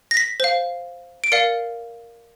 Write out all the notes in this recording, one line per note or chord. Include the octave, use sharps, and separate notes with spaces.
A#6
B6
C5 F5
D7
A#4 D5 F5 C#7